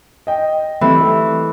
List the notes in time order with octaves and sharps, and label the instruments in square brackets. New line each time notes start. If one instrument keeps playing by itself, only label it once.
[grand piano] D#5 G5
[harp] E3 [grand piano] G3 A3 C4
[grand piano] A3